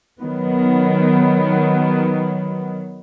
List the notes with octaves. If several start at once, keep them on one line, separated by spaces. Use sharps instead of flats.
D#3 F#3 B3